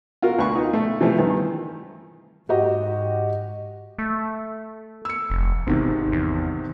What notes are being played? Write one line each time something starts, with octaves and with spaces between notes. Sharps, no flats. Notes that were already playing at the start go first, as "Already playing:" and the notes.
F4 F#4 A#4
D2 B4 C#6
D#4 F4
A3
C3 E3 F3 A3
G2 D#3 E3
G#2 F#4 G4 D#5
A3
E6 C#7
F1
G#1 G#2 C3 D#3
E2